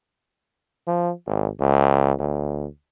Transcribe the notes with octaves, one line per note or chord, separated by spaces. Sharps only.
F3
G#1
C#2
D2